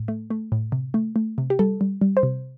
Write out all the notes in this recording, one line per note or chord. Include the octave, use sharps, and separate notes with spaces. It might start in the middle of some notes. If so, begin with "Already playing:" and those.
Already playing: A2
A3
A3
A2
C3
A3
A3
C3
G4
G3 A4
G3
G3
C5
C3